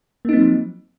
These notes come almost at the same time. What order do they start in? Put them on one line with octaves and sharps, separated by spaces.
A#3 D#4 C4 F#3 F3